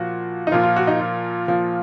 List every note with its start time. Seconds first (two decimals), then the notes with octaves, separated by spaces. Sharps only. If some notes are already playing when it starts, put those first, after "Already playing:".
Already playing: A#2 F3 F#4
0.47 D#4
0.52 A#2 F3 F4
0.63 F4
0.76 F#4
0.87 D#4
0.99 F4
1.48 A#2 F3